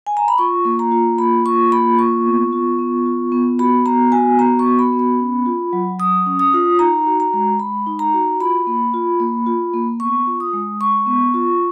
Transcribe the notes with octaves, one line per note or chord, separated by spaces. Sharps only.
G#5
A#5
B5
F4 C#6
A#3
A#5
F4
A#3 B5
F4 C#6
A#3 B5
F4 C#6
B3
F4
B3
F4
B3
F#4 B5
B3 A#5
F#4 G#5
B3 A#5
C#6
F#4
B5
B3
B5
C#4
F4
F#3
F#3 D#6
C#4
D#6
F4
D#4 A#5
F#4
A#5
G#3
G#3 B5
D#4
A#5
F#4
F4 B5
A#3
F4
A#3
F4
A#3
B3 C#6
F4
D#6
G#3
G#3 C#6
B3
F4